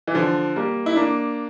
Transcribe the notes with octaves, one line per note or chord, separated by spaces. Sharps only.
E3
D3 F3
G3 A#3
E4
A#3 D4